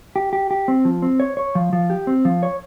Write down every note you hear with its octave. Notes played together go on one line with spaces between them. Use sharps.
G4
G4
G4
C4
F3
C4
C#5
C#5
F3
F3
G4
C4
F3
C#5